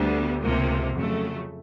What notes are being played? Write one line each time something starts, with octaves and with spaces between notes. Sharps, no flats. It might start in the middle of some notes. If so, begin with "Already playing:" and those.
Already playing: D2 D3 G3 B3
C#2 C3 F3 A#3
F2 C#3 F#3 A3